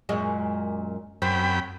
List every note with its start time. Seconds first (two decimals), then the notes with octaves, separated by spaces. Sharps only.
0.09 F#2 A#2 G#3
1.22 F#2 C4 G5 B5